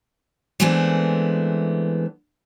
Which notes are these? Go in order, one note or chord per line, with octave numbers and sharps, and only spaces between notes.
E3 G#3 A3 B3 C4 D4